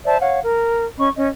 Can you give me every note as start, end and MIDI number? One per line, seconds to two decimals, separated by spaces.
0.05 0.16 72
0.05 0.16 74
0.05 0.16 76
0.05 0.16 81
0.20 0.40 73
0.20 0.40 77
0.20 0.40 78
0.43 0.87 70
0.98 1.09 61
0.98 1.09 75
0.98 1.09 83
0.98 1.09 85
1.16 1.28 61
1.16 1.28 75